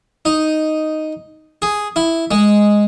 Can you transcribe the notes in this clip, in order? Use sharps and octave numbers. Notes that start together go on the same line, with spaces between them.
D#4
G#4
E4
G#3